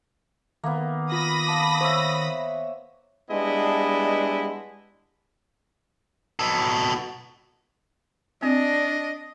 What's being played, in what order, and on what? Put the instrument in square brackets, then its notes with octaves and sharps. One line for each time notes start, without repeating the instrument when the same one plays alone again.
[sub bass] D#3 [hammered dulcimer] A#3 B3
[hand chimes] F4 [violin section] B5 D#6 A#6
[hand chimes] F5 A5 D6
[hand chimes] C5 [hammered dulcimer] C#5 E5
[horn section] G3 G#3 B3 D4 E4 D#5
[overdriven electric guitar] B2 A4
[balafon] C4 [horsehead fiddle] D4 [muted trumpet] D#5